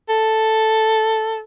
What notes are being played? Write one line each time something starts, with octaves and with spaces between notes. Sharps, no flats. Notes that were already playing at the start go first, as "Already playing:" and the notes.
A4